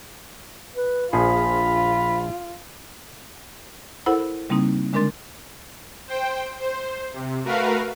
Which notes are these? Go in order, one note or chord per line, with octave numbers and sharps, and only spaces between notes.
B4
A#1 F3 F4 G#4 B5
E4 A4 A#4 C5 F#5 B5
C#3 G3 A#3 C4 D#4
D3 G#3 D4 A#4 C6 A6
C5 G5
C5
C3
A3 F#4 A#4 B4 F5